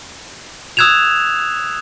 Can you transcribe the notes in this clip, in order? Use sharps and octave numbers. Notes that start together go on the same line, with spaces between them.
D#6 E6 F#6 G#6 E7 F7